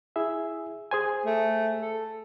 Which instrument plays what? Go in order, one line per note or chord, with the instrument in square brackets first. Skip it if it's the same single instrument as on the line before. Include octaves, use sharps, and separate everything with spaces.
[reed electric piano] E4 G#4 E5
G#4 C5 G#5
[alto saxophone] A3
A4